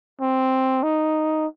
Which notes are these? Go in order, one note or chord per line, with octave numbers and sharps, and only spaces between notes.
C4
D#4